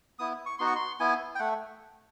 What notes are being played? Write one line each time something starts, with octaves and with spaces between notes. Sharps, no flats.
B3 E4 D#6
C#6
B3 D#4 F#4 C6
C#6
C6
B3 E4 G#5
G5
A3 F#5